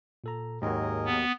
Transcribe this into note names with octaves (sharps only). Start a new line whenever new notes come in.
A#2 A4 A#5
D#2 G#2 F#3 G#4 A#4 D#5
B3